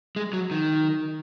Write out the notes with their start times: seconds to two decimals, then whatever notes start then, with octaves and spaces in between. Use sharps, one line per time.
0.16 G#3
0.33 F#3
0.51 D#3